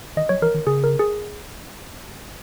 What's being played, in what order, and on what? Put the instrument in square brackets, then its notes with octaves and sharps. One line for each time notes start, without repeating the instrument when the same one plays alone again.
[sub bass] D#3 [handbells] D#5
[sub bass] F#3 [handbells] C#5
[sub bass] E3 [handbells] A#4
[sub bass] D#3
[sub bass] C#3 [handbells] G#4
[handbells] A#4
G#4